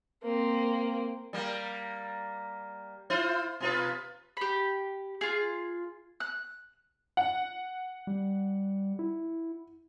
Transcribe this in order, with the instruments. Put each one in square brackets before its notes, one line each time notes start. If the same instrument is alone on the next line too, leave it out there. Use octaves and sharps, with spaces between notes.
[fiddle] A#3 C4
[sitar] G3 A#3
E4 F4 C5
B2 F4 B4
[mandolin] G4 B5
F4 G#4
F#6
[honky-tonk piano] F#5
[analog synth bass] G3
E4